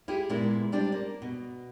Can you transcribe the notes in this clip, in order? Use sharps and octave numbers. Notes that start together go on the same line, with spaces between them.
E4 F4 G4 G#4
A#2 G#3 A#3 B3 E4
G3 D4 C5 D5
A#3
B2